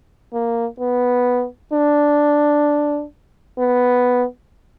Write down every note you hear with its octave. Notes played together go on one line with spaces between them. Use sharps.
A#3
B3
D4
B3